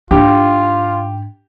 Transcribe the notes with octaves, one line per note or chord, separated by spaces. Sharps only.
G#2 D4 F4 G4